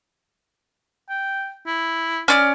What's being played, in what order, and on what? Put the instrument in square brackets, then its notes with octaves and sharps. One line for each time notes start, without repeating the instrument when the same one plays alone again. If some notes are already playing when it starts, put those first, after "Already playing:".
[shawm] G5
E4
[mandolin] C#4 D5 F6